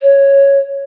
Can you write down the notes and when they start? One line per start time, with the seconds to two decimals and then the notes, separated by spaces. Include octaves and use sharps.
0.01 C#5